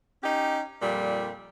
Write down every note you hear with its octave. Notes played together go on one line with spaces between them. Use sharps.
C#4 D#4 G4
F2 A#2 G3